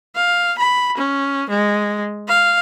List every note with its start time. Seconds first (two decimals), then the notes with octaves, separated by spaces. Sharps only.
0.15 F5
0.58 B5
0.97 C#4
1.49 G#3
2.28 F5